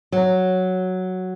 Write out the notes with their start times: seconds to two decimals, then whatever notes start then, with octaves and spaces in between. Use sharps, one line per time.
0.12 F#3